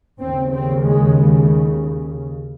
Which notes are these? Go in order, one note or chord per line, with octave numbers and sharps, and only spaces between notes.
D#2 C#3 C4
C4
G#3